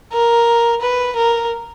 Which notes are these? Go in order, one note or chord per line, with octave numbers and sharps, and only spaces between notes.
A#4
B4
A#4